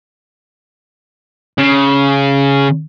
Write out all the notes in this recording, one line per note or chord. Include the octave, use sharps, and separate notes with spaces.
C#3